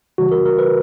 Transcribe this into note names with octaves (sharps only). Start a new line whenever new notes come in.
C#3 E3 G3 F#4
A#4
A#4
B4